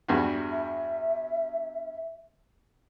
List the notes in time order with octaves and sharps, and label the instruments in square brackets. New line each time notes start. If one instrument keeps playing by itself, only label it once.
[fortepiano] E2 G2 F#4
[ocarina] E5